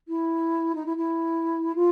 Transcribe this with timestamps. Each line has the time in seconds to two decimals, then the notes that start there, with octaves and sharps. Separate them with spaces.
0.08 E4
0.75 D#4
0.86 E4
0.97 E4
1.75 F4